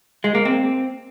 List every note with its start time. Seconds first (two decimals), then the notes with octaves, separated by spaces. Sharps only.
0.24 G#3
0.35 A#3
0.45 C4